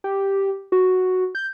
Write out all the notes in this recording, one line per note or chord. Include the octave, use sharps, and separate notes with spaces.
G4
F#4
G6